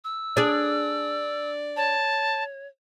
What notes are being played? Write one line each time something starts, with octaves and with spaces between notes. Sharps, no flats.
E6
D4 G#4 D5
C#5 A5